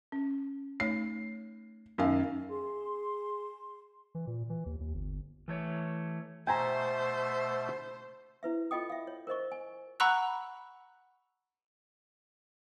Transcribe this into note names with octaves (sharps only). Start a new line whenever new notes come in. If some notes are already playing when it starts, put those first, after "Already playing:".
C#4
A3 D#4 C#5 C7
F#2 D#3 C#4 F5
G#4 C6
E3
A#2
E3
D#2
D#2
G1
E3 A3 C#5
B2 A3 C5 E5 G5 G#5 A#5
E4 B4 E5
F4 A4 D#5 G5 D#6
E5 F5
C#5
A#4 C5 D#5 C#6
G#5
F#5 A#5 B5 C#6 E6 F#6